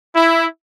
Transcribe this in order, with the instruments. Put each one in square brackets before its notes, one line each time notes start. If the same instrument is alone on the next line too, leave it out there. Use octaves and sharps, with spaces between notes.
[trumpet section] E4